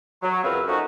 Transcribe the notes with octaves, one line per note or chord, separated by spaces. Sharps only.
F#3
C#2 F#2 C4 B4 E5 F5
F3 A3 C#4 D#4 F#4